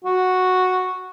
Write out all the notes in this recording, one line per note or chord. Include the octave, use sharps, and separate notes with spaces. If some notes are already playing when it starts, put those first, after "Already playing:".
F#4